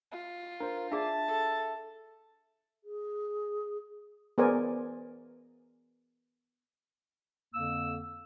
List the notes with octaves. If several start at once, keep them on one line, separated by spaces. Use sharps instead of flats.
F4
D4 A#4 C5
D4 G#4 D5 E5 A5
A4
G#4
B3 G#4 A#4 C5 D5 G#5
F2 D3 A#3 E6